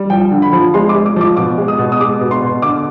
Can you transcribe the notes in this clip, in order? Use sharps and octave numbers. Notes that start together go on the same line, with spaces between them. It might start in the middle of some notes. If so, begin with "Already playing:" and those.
Already playing: G3
F3 G5
D3
B5
F3
G#3 C6
D6
G#3
D6
F3 D6
B2 D6
G#3
D#6
B2
D#6
G#3 D6
B2
C6
B2
D3 D6